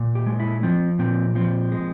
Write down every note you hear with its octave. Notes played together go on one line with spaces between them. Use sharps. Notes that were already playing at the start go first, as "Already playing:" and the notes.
Already playing: A#2
G4
G#3
E4
F3 C4
A#2 C4
F3 C4
G#3